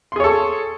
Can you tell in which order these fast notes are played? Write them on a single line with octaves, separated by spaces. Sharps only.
C6 G#4 C#5 A4